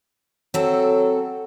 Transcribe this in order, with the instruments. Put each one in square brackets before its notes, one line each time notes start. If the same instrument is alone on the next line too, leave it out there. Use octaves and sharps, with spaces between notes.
[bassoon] F#3 [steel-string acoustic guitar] C4 A4